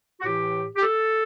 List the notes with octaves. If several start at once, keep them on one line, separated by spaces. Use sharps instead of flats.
F#4
A2 E3 G4
G4
A4